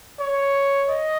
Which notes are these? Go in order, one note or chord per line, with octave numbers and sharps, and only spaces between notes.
C#5
D#5